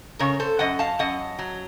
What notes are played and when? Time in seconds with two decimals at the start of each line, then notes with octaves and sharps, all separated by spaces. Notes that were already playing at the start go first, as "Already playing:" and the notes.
0.19 C#3 A#4 C#5
0.40 A4 C5
0.59 F#2 D#5 F#5
0.79 F5 A5
0.99 F#2 D#5 F#5
1.39 F#3